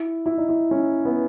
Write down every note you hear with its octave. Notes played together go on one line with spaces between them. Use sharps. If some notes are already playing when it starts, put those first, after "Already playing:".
Already playing: E4
E4
D#4
E4
C#4
B3